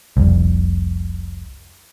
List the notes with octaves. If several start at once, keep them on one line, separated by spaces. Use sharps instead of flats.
F1 C2